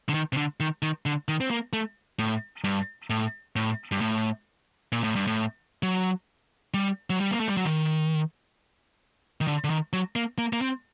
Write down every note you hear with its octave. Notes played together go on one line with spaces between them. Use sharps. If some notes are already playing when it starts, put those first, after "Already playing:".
D3
D#3
C3
D3
D#3
D#3
D3
D#3
C4
A#3
A3
A2
G2
A2
A2
G2
A2
A#2
A2
G2
A2
F#3
G3
F#3
G3
A#3
A3
G3
F#3
D#3
D#3
D3
D3
D#3
F#3
A#3
A#3
A#3
C4